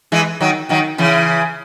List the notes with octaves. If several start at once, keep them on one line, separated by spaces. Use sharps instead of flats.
E3 G#3
D#3 F#3
D#3 F#3
C#3 E3